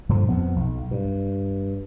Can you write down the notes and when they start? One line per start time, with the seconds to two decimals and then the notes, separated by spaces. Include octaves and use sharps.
0.09 G2 A#2 D3 F3
0.29 F2 F3 B3
0.56 B1
0.91 G2